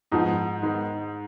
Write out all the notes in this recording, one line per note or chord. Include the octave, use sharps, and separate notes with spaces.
G#2 F3 B3 D#4
D#3 G#3 B3 D#4